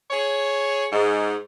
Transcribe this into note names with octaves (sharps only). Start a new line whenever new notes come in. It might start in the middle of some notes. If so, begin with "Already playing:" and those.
G#4 C#5
G#2